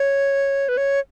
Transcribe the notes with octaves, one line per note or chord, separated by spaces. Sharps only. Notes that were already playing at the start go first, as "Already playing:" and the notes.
Already playing: C#5
B4
C#5